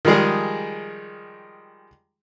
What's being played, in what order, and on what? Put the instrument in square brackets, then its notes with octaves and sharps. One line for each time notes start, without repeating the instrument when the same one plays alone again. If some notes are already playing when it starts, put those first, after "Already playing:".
[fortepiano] D#3 F3 G3 G#3 G#4